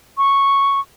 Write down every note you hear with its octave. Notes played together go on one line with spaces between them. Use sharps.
C#6